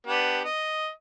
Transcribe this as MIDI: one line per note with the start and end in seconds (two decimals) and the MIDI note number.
0.07 0.43 59
0.07 0.43 62
0.07 0.43 67
0.45 0.89 75